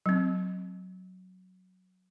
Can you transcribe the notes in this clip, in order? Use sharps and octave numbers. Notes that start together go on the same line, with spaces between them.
F#3 C4